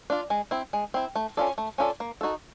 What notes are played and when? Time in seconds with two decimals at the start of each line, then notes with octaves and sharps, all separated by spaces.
0.10 D4 F4
0.30 G#3
0.51 C4 E4
0.73 G#3
0.94 C4 E4
1.16 A3
1.37 C#4 F4 A4 D5
1.58 A3
1.78 C#4 F4 A4 D5
2.00 A#3
2.21 D#4 F#4 A4